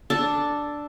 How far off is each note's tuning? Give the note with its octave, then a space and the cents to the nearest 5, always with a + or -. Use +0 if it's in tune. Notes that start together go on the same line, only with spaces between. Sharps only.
D4 +0 A4 +0